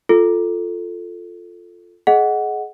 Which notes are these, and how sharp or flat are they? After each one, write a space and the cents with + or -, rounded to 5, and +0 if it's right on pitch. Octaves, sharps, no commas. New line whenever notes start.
F4 +0 A4 +0
G#4 +25 D#5 +0 F#5 +0